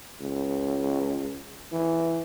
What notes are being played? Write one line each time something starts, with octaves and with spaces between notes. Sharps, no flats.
C#2
E3